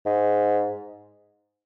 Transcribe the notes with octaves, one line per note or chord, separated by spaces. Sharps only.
G#2